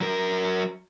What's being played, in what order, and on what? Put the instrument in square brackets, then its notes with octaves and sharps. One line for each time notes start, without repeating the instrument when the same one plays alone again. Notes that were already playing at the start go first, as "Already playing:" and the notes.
[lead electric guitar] F#3 A#4